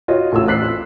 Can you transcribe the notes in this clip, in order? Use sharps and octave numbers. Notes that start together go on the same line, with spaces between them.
F4 F#4 C#5 D#5
A1 A2 F4 E6
C4 F#6 B6 C7
F4